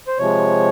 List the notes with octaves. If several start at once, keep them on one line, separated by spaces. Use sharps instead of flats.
C5
C3 F3 G#3 C#5